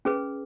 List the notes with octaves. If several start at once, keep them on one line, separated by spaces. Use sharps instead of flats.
C#4 G#4 B4